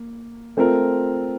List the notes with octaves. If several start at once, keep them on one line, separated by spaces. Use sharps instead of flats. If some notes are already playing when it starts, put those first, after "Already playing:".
Already playing: A#3
A3 C4 F4 A#4